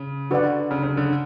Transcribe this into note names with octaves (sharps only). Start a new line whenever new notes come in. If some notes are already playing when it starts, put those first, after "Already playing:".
Already playing: C#3
D3 F#4 B4 D5 F#5
C#3
C#3
D3